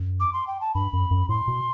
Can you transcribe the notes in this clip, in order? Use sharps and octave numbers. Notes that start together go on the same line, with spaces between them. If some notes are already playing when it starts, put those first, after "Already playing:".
Already playing: F#2
D6
C6
G5
A5
G2 B5
F#2
F#2
A2 C6
B2